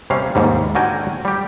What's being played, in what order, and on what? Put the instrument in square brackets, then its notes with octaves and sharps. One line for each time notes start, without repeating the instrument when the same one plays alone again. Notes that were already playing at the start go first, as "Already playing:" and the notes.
[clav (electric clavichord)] C3 G3 C#4 F5
D#2 G#2 G3
D3 D#3 F#4 A#4 G5 G#5
G3 G4